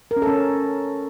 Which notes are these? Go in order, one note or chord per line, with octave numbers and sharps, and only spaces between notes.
A#4
C#4
A4
C#4